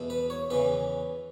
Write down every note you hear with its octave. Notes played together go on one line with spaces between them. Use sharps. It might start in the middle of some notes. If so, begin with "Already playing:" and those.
Already playing: E2 B2
B4
C#5
E2 C#3 E3 B4